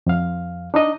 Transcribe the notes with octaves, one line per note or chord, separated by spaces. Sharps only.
F2 F5
D4 D#4 D#5